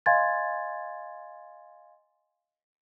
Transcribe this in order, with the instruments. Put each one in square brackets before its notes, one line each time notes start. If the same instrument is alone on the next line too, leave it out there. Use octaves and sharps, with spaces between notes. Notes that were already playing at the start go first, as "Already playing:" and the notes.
[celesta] D#5 F5 G#5 C6 G#6 A6